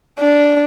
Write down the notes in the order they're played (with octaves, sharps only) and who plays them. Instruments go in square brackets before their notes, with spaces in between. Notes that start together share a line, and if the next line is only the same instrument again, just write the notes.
[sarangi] D4